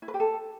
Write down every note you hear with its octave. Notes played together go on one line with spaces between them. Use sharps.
E4
B4
G4
A4